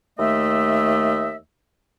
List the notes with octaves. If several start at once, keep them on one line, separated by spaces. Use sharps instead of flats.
D#2 A3 D#5 E5